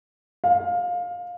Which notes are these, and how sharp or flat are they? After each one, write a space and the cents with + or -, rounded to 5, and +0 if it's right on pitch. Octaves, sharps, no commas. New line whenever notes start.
F5 +20